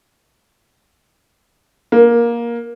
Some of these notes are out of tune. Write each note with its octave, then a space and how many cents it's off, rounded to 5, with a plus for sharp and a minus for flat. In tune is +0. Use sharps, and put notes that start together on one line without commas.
A#3 +15